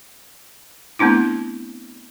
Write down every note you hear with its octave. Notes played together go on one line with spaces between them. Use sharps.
A3 B3 C4 D4 E4